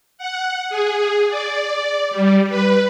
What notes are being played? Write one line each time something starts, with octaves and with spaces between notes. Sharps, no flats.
F#5
G#4
D5
G3
B4